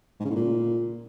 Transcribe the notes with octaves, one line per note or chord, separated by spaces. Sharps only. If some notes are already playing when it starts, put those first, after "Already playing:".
G#2
C#3
A2
A#2